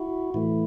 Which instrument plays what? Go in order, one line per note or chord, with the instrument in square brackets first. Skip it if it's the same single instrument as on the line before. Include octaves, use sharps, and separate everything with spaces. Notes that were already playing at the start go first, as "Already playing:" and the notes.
Already playing: [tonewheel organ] E4 F#4
A2 E3 A3 E4